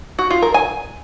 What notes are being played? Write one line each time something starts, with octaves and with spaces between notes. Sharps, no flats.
F#4
F4
A#4
G#5